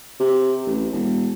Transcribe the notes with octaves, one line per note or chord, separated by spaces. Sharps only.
C3
A1
E1